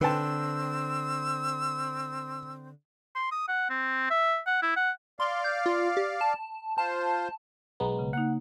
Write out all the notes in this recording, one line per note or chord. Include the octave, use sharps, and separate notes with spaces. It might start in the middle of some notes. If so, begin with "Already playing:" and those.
D3 C4 B4 G5 A5 E6
C6
D#6
F#5
C4
E5
F#5
E4
F#5
D5 F5 C6
G6
F4
G4
A5
F4 C5 A5
B1 G#3 B3 A#5
C#3
A#3 D#4 F#5